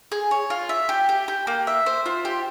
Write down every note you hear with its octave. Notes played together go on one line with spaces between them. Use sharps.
G#4
C#5
F4
E5
G4
G4
G4
A#3
E5
C5
F4
G4